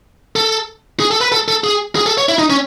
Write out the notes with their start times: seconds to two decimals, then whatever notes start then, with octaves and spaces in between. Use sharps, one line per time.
0.36 A4
1.00 G#4
1.11 A4
1.21 B4
1.32 A4
1.48 A4
1.64 G#4
1.96 G#4
2.06 A4
2.18 C#5
2.29 E4
2.38 D#4
2.50 C#4